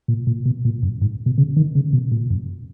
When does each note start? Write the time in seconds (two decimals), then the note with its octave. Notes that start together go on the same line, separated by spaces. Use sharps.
0.08 A#2
0.27 A#2
0.46 B2
0.65 A#2
0.83 F#2
1.01 G#2
1.26 B2
1.38 C#3
1.56 D#3
1.75 C#3
1.93 B2
2.12 A#2
2.30 F#2